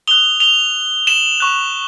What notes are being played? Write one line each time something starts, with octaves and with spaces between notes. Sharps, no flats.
D#6 F#6 F7 G7
F7 G7
E7 F#7
C#6 F#6